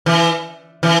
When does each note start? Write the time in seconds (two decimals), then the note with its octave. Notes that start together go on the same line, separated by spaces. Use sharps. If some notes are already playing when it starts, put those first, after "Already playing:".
0.06 E3
0.83 E3